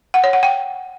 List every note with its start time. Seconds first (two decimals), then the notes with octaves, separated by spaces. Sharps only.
0.14 F#5
0.24 C#5
0.33 F#5
0.43 G5